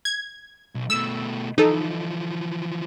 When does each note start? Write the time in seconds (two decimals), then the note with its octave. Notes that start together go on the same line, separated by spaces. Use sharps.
0.05 G#6
0.75 B1
0.90 B2 A3 E6
1.58 E3 F3 D#4 A4